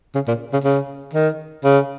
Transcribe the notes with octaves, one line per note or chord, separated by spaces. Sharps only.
C#3
A#2
C#3
C#3
D#3
C#3